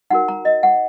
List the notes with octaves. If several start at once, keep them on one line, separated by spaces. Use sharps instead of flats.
D#4 F#4 A#4 F#5
A#5
D#5
F#5